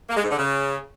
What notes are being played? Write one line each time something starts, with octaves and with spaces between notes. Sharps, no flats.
A#3
G#3
G#2
D3
C#3